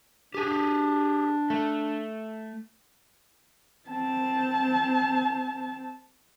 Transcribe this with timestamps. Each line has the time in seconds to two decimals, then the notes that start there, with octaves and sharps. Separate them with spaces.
0.34 D4 G4 G#4
1.50 A3
3.89 C4 A5